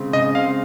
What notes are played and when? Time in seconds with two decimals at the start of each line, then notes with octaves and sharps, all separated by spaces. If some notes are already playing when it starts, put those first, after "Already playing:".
Already playing: C#3 G#3 C4
0.13 C#3 D#5
0.35 G#3 C4 F5